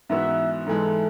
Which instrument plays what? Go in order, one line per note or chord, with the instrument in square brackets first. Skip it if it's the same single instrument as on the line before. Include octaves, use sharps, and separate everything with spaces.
[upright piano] G#2 E3 B3 F#4 [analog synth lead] E5
[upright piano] G#2 E3 G#3 [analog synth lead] A4